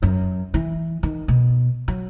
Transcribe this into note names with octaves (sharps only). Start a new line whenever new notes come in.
F#2
E3
D#3
B2
F#3